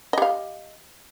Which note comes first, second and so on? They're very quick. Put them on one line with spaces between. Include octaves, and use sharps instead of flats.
D#5 G4 F5